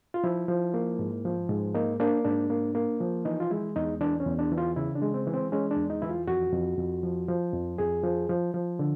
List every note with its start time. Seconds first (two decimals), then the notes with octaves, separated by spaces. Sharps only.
0.14 F4
0.24 F3 E4
0.48 F3
0.74 A#3
0.99 G#2
1.25 F3
1.49 G#2
1.74 A#3 D#4
2.00 A#3 D4
2.25 G#2 D4
2.50 A#3
2.75 A#3
3.00 F3
3.25 E3 D#4
3.40 F4
3.50 G#3 E4
3.76 E2 D#4
4.01 E3 D4
4.20 C#4
4.26 E2
4.39 D4
4.52 E3
4.58 F4
4.76 C#3 E4
4.95 D4
5.02 G#3
5.14 C4
5.27 E3
5.33 C4
5.52 G#3 C#4
5.71 D4
5.77 E2
5.90 D#4
6.02 E3 E4
6.09 F4
6.28 F2 F#4
6.53 F2
6.78 F2
7.03 F3
7.28 F3
7.53 F2
7.78 F2 G#4
8.04 F3
8.29 F3
8.54 F3
8.79 D3